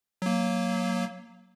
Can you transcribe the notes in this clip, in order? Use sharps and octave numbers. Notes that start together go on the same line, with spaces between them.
F#3 A#3